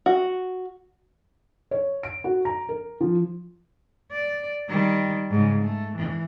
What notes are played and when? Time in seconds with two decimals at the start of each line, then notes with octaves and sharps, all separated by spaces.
0.06 F#4
1.71 C#5
2.03 D7
2.24 F#4
2.45 A#5
2.69 A#4
3.01 F3
4.12 D5
4.69 D#3 G3
5.31 G#2 C#3
5.61 A3
5.95 E3